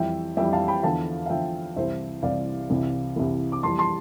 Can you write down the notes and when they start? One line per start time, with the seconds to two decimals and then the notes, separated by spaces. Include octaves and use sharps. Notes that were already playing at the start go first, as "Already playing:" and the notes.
Already playing: F2 E3 G3 E5 G5
0.37 F2 E3 G3 E5 G5
0.53 F5 A5
0.68 G5 B5
0.83 E2 D3 F3 F5 A5
1.26 F5
1.30 E2 D3 F3 E5 G5
1.76 C2 C3 E3 G3 C5 E5
2.23 C2 C3 E3 G3 D5 F5
2.70 C2 C3 E3
3.16 C2 C3 E3
3.52 D6
3.63 F2 E3 G3 A5 C6
3.78 A5 C6